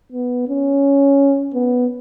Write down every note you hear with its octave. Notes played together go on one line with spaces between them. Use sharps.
B3
C#4
B3